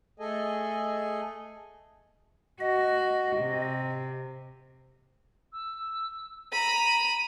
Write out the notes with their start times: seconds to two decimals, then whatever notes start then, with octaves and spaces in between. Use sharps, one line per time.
0.20 A3 G#4 A4 D#5 G#5
2.61 F#4 D#5
3.38 C3
5.53 E6
6.52 A#5 B5 D#7